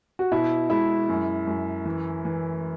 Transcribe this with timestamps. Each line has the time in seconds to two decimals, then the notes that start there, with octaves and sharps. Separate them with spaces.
0.19 F#4
0.32 B2 E4
0.70 G#3 E4
1.09 F#2
1.47 F#2
1.85 E3
2.25 E3